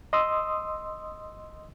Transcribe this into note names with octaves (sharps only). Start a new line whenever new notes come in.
D#5 C6 D#6 E6